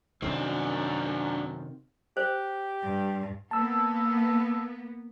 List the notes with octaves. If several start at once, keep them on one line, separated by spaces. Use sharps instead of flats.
F#2 C3 D#3 C4 D4
G4 C5
G2
A#3 B3 A5 E6